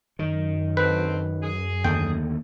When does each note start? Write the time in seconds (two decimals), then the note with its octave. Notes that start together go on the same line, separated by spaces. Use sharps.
0.19 F#2 D#3
0.77 D2 B2 C4 B4
1.42 G#4
1.84 D#2 D3 A3 G5